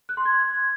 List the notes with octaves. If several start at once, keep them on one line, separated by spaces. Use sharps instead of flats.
F#6
C6
G#6